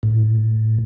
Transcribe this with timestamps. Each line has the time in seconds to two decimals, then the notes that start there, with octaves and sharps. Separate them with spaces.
0.03 A2